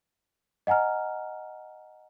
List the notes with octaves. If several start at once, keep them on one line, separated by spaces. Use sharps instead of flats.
D#5 F#5 G#5 A#5 F6